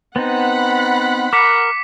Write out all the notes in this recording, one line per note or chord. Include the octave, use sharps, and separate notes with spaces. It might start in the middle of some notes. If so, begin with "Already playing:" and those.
B3 C4 D#4 F#5 B5
A#4 D6 B6 C#7